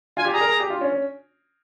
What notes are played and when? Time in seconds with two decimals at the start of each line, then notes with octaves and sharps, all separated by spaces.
0.17 F4 G#5
0.25 G4
0.29 G#5
0.33 G#4 A#5
0.41 A#4
0.49 G#4
0.60 G4
0.70 F4
0.81 C#4
0.92 C#4